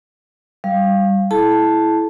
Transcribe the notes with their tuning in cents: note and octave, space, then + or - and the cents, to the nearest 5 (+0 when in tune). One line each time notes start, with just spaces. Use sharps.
G3 +0 F5 +0
E4 +0 A4 -45 A5 +0